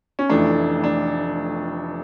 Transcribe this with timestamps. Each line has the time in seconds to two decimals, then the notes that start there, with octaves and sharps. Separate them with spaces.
0.19 C#4
0.30 F1 F2 E3 A3 D4
0.84 D4